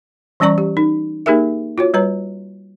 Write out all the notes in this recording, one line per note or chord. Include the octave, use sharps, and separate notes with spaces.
E3 G3 C#4 D5 A#5 C#6
G4
D#4
A#3 D#4 G4 G#4 A#4 E5
F4 F#4 C#5
G3 B4 C#5 A#5